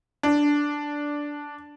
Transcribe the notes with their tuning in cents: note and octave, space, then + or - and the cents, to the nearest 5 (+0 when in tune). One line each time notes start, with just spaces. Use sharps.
D4 -5